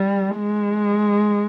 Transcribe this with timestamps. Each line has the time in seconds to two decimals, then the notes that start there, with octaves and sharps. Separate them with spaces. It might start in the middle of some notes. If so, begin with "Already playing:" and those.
Already playing: G3
0.36 G#3